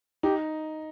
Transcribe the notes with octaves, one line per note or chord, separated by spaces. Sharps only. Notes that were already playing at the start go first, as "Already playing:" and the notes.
D#4 G4